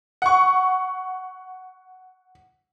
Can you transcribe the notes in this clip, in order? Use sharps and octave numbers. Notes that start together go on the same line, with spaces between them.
F#5 C#6